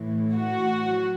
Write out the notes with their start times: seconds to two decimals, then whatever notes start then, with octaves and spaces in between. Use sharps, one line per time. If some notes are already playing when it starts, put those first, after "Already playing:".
Already playing: A2 E3
0.34 F#4
0.86 F#3